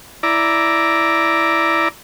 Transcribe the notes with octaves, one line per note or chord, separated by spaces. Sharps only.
E4 D5 A#5